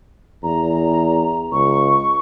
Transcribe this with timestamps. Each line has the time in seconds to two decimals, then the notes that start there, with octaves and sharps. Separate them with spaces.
0.43 E2 A#5
1.52 C#2 C#6